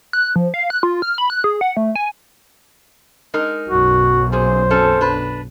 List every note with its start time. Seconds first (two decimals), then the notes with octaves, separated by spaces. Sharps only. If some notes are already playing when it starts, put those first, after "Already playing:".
0.13 F#6
0.36 F3
0.54 F5
0.70 F#6
0.83 F4
1.02 F6
1.18 B5
1.30 F#6
1.44 G#4
1.61 F#5
1.77 A3
1.96 G#5
3.34 G#3 D#4 A#4
3.69 B1 F#2 F#4
4.32 A#2 G#4 C5
4.70 C4 C#4 A4
5.01 D4 B4